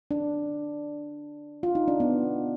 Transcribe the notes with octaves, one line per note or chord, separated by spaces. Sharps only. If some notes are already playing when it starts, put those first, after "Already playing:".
D4
F4
D#4
D4
B3